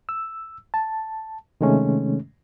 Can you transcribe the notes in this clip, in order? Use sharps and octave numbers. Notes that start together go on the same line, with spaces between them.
E6
A5
C3 D#3 G#3 A3 C#4